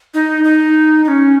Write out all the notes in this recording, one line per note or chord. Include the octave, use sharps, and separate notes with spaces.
D#4
D#4
D#4
C#4